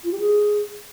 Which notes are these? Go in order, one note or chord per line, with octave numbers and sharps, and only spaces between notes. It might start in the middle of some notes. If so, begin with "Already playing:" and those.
F4
G4
G#4